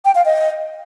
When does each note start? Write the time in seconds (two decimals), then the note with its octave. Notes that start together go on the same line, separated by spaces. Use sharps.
0.05 G5
0.15 F5
0.25 D#5